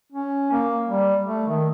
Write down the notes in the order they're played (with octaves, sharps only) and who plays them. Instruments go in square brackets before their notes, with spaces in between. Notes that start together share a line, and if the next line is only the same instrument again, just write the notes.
[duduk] C#4
A#3
G3
A3
D#3